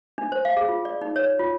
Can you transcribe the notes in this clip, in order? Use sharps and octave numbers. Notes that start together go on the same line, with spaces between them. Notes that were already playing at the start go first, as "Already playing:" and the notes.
D4
C5
F5
G#4
F4
D5
D#4
C#5
F4